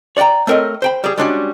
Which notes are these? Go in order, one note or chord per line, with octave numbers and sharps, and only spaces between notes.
C#5 D5 F#5 G5 A#5
A3 C4 A#4 C#5 D#5
C5 G5 B5
G3 G#4
G3 G#3 C#4 D4 F4 F#4